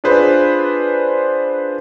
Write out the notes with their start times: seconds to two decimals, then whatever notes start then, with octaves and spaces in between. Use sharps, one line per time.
0.04 D4 F4 G#4 B4 C5